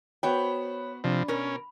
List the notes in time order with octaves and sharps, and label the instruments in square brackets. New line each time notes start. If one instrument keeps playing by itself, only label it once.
[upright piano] B3 F#4 C5 [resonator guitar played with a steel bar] C#5 G5 [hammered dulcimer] B5
[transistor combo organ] C3 F3 [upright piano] D4
[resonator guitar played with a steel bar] B2 A#4 [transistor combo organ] C#4